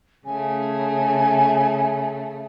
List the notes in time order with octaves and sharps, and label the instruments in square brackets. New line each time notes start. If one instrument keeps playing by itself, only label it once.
[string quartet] C#3 A3 [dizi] G#5